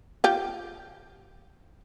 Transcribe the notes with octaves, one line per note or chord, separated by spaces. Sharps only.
F4 G4